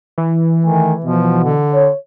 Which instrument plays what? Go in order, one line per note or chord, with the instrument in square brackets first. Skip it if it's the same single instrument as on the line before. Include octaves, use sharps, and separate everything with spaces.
[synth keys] E3
[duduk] D#3 [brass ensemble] A3 G#5
[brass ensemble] B2 [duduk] F3
[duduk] D3
[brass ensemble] C#5